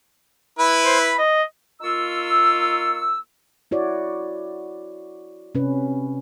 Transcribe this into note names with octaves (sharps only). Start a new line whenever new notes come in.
E4 B4
C5
B5
D#5
A#3 D#4 F4 C#6 E6
E4 F#4 C#5 D5
C3 C#4 B4